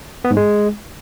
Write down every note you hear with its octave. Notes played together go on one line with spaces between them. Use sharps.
B3
G#2
G#3